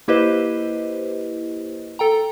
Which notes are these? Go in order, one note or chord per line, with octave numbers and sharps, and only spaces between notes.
A#3 E4 G4 B4 C5 D#5
A4 G5 A#5